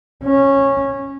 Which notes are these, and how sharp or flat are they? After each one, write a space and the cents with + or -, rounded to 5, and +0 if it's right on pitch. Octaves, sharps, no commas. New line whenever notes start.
C#4 -15